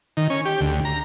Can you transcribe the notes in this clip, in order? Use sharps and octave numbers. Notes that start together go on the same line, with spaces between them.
D#3
C#4
G4
D2
A#5